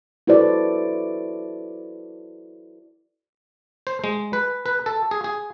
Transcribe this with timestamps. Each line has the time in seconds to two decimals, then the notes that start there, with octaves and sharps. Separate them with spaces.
0.27 E4 F#4 A4 B4 C5 D5
3.87 C5
4.04 G#3
4.33 B4
4.66 B4
4.86 A4
5.11 G#4
5.24 G#4